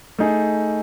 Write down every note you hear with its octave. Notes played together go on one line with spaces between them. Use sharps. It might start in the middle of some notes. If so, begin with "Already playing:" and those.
A3 D#4 G#4